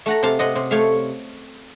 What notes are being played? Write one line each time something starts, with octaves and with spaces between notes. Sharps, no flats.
A3 F#5 A#5
C3 F5 A5
C3 D#5 F#5
C3
A3 C#5 F5